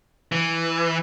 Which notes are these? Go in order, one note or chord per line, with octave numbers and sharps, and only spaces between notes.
E3